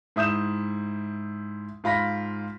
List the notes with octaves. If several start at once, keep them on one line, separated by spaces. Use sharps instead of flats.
G#2 E4 D#6 G6 E7
G#2 F4 B5 A#6 B6